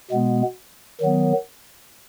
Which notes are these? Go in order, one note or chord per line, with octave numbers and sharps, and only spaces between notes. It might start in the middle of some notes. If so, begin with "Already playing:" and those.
B2 G#3 B3
D#3 F#3 B3